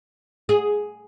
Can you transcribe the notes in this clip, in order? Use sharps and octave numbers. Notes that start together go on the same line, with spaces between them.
G#4